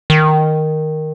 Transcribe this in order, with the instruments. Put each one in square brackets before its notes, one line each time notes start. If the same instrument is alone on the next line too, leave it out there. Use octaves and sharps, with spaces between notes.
[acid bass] D#3